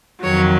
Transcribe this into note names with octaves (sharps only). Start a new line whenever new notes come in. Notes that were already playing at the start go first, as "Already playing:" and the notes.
F2 D#3 F#3 C#5